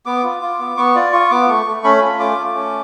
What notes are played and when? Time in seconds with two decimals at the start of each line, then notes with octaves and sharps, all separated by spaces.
0.06 B3 D6
0.24 F4
0.41 F4
0.59 B3
0.77 B3 C#6
0.95 F4 D5
1.13 F4 C#6
1.31 B3 D6
1.48 A3 C#6
1.66 A3
1.84 C#4 B5
2.02 F4
2.19 A3 D6
2.38 A3
2.55 C#4